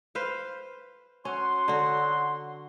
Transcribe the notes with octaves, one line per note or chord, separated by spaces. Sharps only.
B4 C5 F5
F#3 C#4 F#5 C6
D3 F#4